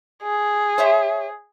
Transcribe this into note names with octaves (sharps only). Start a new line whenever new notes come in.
G#4
C5 C#5 E5